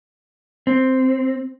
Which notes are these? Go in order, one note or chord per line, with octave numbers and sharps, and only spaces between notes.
C4